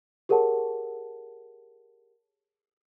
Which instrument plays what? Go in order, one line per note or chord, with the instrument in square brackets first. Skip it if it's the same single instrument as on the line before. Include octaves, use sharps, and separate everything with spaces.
[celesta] G4 G#4 A#4 C#5 F#5 A5